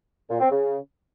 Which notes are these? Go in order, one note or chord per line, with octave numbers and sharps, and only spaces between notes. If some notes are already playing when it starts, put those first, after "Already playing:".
A#2
C4
C#3